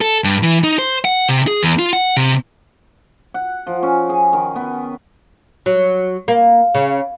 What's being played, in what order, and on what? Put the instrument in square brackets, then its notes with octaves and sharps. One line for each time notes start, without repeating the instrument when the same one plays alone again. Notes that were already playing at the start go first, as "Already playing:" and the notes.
[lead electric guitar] A4
G2
E3
D#4
C5
F#5
C3
G#4
E2
F4
F#5
C3
[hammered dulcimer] F#5
F3
C#4
G#4
D#3
B3
[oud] F#3
A#3
C#3